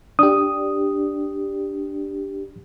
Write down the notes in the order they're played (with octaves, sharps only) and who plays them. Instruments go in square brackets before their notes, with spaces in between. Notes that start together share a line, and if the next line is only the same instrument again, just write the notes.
[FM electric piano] D4 G4 [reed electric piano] D#6